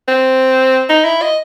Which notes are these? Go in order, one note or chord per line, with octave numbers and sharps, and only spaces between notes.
C4
D#4
E4
D#5